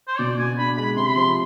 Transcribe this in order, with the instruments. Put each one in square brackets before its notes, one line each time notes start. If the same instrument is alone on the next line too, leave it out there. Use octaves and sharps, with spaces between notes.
[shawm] C5
[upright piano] B2 [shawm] D5
[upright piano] B2 [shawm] G#5
[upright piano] D4 [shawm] B5
[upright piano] G#3 [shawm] B5
[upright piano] C3 [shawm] C6
[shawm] B5
[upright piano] F3 [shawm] C6